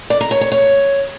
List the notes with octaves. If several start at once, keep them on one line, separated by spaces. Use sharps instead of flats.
D5
A#5
C#5
C#5
C#5